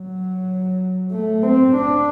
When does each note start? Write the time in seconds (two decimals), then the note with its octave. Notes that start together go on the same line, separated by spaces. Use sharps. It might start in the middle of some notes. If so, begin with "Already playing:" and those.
Already playing: F#3
1.12 A3
1.43 C4
1.75 D4